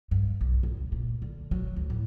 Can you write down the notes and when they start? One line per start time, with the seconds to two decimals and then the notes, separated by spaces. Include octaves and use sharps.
0.11 G2
0.41 B1
0.63 C#2
0.92 A#2
1.22 D3
1.51 F#3
1.76 D2
1.90 A2